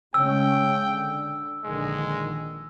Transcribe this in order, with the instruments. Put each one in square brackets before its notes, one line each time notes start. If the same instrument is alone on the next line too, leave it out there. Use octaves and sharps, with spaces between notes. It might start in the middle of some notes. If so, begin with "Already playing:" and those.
[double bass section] C#3 G#3 C#4 [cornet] G5 [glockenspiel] E6
[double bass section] D3
[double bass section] A#1 D3 D#3 [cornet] G#3